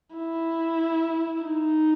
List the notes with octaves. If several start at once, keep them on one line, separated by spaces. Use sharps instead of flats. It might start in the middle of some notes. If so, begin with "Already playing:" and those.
E4
D#4